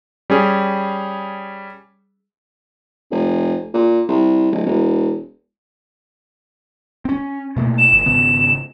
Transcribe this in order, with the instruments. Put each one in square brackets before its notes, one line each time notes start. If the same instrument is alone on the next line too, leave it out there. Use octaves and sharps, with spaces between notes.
[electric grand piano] G3 C#4 G#4
[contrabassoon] F1
A#2
C2
D1
E1
[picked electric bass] C4 C#4
B2 A3 A#3
[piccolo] E7
[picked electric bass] G1
[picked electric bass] G#1 C#3 B3 [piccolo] E7